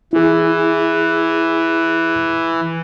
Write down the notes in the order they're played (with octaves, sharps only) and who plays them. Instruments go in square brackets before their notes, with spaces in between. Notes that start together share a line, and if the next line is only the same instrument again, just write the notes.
[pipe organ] E3 [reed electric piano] E4 G#4